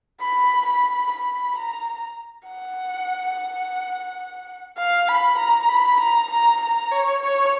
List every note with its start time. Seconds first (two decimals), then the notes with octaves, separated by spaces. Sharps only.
0.20 B5
0.65 B5
1.11 B5
1.57 A#5
2.49 F#5
4.78 F5
5.08 B5
5.38 A#5
5.69 B5
6.00 A#5
6.30 A#5
6.61 A#5
6.91 C#5
7.22 C#5